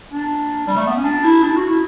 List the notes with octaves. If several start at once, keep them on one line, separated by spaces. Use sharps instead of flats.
D4
G3
A3
B3
C#4
D4
E4
D4
E4
F#4
E4